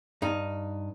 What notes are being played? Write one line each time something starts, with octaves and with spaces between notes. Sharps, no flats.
G2 D#4